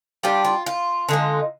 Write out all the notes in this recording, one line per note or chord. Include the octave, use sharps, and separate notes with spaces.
G3 D4 F4 G4
F4
F4
D3 G#3 D#4